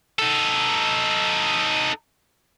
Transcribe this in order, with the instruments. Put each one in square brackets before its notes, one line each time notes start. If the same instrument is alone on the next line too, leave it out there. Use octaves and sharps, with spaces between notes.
[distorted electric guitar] D#4 A4